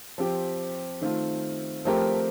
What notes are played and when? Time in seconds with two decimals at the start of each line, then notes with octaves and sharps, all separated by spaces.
0.18 F3 C4 G4
1.01 D#3 A3 C4 F4
1.85 F3 A3 C4 G4 A#4